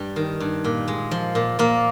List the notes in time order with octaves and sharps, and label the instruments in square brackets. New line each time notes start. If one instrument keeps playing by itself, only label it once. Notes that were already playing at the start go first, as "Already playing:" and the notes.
Already playing: [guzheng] G2 G3
D#3
G2
A#2
G#3
F3
A#2
A#2 A#3